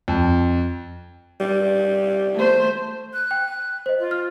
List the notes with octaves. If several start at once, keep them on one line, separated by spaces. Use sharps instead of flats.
F2
G3
A3 C5
F#6
G5
C5 D#5
F4
F6